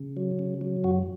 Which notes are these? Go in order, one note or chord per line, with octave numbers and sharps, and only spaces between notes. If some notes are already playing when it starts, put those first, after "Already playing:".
Already playing: C#3
F#3
C#3
F#3
F#2 F#4